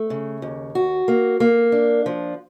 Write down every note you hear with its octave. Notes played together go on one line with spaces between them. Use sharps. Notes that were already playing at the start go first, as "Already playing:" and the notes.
Already playing: A3
C#3
D#2
F#4
A#3
A#3
D4
F3